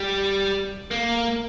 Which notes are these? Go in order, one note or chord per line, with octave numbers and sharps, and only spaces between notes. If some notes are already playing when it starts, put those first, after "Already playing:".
Already playing: G3
A#3